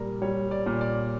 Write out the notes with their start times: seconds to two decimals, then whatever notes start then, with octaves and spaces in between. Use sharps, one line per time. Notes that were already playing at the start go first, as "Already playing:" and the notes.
Already playing: A#2 G3 A#4
0.22 G3 C#5
0.51 D5
0.66 A#2
0.81 D5